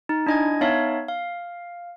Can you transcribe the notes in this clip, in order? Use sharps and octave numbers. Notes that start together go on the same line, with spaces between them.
D#4
D4 E4 D#5 G#5 G#6
B3 D#4 C#5 E5 F5 A5
F5